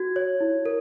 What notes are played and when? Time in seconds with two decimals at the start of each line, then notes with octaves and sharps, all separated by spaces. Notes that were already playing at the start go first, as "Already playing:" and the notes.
Already playing: F#4 G#6
0.16 C#5
0.41 E4
0.66 A#4